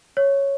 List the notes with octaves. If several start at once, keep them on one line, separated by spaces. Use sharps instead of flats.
C#5